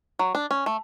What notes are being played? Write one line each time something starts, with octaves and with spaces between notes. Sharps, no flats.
F#3
D4
C#4
A3